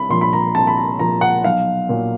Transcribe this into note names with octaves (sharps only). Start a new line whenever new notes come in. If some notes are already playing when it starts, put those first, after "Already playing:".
Already playing: C2 B5
A#2 F3 C6
B5
A#5
C2 A5
B5
A#5
A#2 F3 A#5
F#5
B1 F5
A#2 F#3